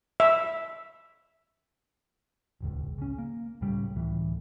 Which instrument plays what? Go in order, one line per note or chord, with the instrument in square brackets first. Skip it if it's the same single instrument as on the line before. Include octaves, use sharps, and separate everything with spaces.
[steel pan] E5
[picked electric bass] D#1 G#1 C#2
C#3 C#4
A#3
C#2 A2 C#3 G3
C#2 A2 E3